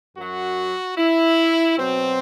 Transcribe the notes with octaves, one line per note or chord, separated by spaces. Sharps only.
F#2 F#3 F#4
E4
B2 F#3 C4